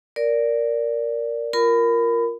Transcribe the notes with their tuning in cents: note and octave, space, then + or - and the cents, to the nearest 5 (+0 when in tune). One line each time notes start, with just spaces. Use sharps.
A#4 +0 D5 -10
F4 +0 A#4 +0 B5 +20